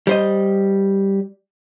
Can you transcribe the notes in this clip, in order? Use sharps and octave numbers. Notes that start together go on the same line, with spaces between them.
G3 C5 D#5